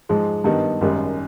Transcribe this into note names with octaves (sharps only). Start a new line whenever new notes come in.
G#2 F3 G#3
G2 D#3 G3 B3 D#4
G#1 F#2 D#3 G3